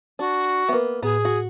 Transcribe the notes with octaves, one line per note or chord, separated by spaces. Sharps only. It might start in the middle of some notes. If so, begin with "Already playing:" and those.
D4 F#4
A#3 B3 B4 E5
A2 B3 G#4
F#4